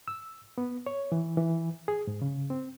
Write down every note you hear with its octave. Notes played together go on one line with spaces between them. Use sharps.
E6
B3
C#5
E3
E3
G#4
G#2
C#3
C4